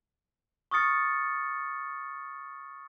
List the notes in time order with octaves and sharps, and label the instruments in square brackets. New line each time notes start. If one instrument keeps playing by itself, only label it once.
[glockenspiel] C#6 D#6 F6 A6 C#7